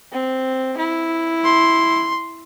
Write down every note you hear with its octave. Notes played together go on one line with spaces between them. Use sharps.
C4
E4
C6